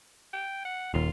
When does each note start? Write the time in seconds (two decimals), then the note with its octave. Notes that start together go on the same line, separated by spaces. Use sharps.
0.33 G5
0.65 F#5
0.94 D#1 D#2 F4